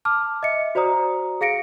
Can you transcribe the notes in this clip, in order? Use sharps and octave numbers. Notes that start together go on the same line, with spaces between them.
A5 D6 F6
D#5 E5 C#7
F#4 C5 D5 A#5 D#6
G#4 F5 A#6 C#7 D7